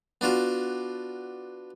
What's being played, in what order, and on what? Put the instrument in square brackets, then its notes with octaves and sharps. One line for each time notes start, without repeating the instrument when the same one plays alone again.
[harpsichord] B3 D4 F4 F#4